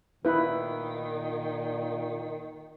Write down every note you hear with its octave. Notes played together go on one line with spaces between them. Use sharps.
A#2 D#3 E4 B4